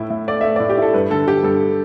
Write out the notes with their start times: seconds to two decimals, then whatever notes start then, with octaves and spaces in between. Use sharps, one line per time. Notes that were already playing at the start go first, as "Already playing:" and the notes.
Already playing: A2 E4
0.10 A2
0.28 A3 D5
0.41 A3 E5
0.56 A2 D5
0.70 G4
0.77 E4 A4
0.94 G2 B4
1.10 D3 A4
1.27 D3 G4
1.43 G2 A4